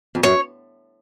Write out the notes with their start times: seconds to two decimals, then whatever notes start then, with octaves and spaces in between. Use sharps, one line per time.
0.15 F2
0.23 F#2 C#5